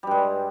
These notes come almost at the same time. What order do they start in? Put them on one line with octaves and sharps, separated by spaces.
G3 G2 G#3